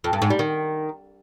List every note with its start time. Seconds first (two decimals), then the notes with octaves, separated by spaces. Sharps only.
0.04 F2
0.13 G2
0.22 G#2
0.30 G3
0.39 D#3